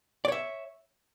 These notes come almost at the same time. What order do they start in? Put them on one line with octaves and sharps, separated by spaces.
D5 C#5 E5